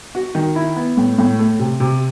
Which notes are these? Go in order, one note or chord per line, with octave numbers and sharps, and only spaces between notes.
F#4
D#3
E4
B3
A2
A2
A3
C3
C3